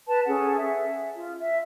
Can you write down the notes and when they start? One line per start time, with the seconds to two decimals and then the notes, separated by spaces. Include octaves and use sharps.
0.07 B4 A5
0.27 C#4 G#4 A4 F#5
0.58 E5
1.15 F4
1.41 E5